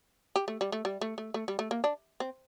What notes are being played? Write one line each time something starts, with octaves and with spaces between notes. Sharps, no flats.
G4
A3
G3
A3
G3
A3
A3
A3
G3
A3
A#3
D4
C4